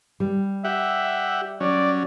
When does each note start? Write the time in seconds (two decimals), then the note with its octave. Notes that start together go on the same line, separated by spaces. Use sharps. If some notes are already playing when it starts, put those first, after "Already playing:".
0.20 G3
0.64 G4 E5 F#5
1.60 F#3 C#4 D5